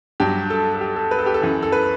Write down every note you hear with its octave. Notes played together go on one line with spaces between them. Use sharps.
G2 F#3 G4
A4
A4
G4
A4
B4
A4
G4
A4
F#2 E3
A4
B4